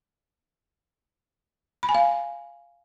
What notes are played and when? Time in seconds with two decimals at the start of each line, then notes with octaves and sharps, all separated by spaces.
1.83 B5
1.89 G#5
1.95 F5